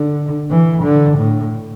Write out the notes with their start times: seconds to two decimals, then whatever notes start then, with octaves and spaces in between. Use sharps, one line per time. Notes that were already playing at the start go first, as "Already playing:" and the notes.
Already playing: D3
0.51 E3
0.83 D3
1.18 A2